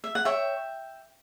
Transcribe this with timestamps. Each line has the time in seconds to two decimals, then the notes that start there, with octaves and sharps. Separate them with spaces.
0.04 E5
0.15 F#5
0.25 C#5 E5 G5